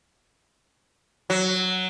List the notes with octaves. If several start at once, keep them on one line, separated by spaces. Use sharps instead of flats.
F#3